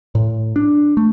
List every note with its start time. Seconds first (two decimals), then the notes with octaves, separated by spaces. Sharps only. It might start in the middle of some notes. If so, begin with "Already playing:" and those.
0.15 A2
0.56 D4
0.97 A3